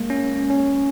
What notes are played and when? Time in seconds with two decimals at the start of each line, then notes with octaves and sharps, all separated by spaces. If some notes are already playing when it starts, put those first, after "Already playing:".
Already playing: G#3 A#3
0.10 C#4
0.50 C#4